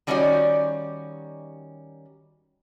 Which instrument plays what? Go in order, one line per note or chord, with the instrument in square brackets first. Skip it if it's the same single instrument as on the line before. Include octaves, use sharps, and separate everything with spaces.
[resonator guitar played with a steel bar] D#3 G3 C#4 D#4 F#4 D5